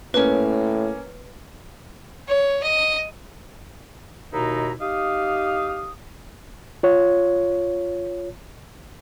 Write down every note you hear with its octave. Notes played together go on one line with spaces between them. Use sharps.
A2 A#3 C#4 B4
C#5
D#5
D#2 B2 D#4 E4 A#5
D#4 G4 F5 D#6
F4 C#5